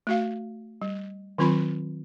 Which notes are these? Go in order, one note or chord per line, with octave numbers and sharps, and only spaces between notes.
A3 F#4 F5
G3
D#3 F#3 C4 F4 B5